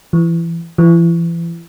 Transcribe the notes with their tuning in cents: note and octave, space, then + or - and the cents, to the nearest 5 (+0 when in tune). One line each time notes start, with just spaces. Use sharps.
E3 +25
E3 +35